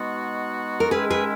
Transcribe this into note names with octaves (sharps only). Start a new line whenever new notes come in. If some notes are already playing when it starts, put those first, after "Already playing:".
Already playing: B2 G#3 B3 D#4 F#4
A#4
D#3 G#3 C#4 E4 G#4 B4
G#4 B4